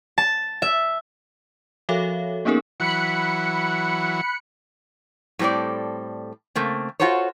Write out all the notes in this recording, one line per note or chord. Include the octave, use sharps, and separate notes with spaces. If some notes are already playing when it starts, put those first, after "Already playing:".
A5
E5
F3 F#4 A4 C#5 E5 F5
A#3 B3 C#4 D#4 G#4 A#4
E3 F#3 B5 F#6 C#7
A2 G3 C4 A4 D5
C#3 A3 A#3 C4
F4 F#4 A4 C5 C#5